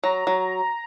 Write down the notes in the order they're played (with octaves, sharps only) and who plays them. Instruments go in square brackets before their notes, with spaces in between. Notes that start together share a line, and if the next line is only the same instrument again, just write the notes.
[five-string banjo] F#3 [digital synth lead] A#5
[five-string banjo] F#3